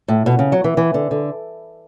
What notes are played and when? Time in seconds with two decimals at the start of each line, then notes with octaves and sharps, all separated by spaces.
0.08 A2
0.26 B2
0.39 C#3
0.52 F#3
0.64 E3
0.77 E3
0.94 D3
1.11 D3